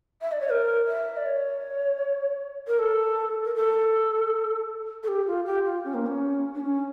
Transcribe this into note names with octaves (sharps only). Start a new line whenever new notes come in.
E5
D5
C#5
A#4
E5
D5
C#5
A#4
A4
A#4
A4
A4
G4
F4
G4
F4
C#4
A#3
C#4
D4
C#4